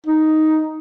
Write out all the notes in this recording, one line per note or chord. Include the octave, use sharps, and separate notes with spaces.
D#4